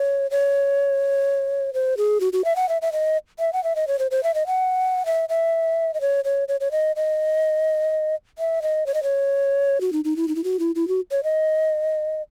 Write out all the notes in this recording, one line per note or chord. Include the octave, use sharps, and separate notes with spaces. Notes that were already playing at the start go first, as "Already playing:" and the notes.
Already playing: C#5
C#5
C5
G#4
F#4
F#4
E5
F#5
E5
E5
D#5
E5
F#5
E5
D#5
C#5
C5
C5
E5
D#5
F#5
E5
E5
D#5
C#5
C#5
C#5
C#5
D#5
D#5
E5
D#5
C#5
D#5
C#5
F#4
D#4
D#4
E4
D#4
E4
F#4
E4
E4
F#4
C#5
D#5